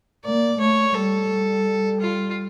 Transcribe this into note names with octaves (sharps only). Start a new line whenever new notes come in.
A#3 D5
A3 C#5
G3 A4
G3
F4